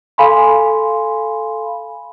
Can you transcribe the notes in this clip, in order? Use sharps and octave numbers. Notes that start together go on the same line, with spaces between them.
A4 F5 G#5 B5 C6